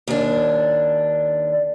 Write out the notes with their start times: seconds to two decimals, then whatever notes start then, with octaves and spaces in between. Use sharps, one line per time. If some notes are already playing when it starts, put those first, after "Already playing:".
0.07 D#2 D4